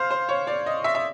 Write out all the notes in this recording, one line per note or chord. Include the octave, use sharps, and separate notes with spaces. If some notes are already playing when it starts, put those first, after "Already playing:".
Already playing: C5 F5
C5
C#5
D5
D#5
E5
E5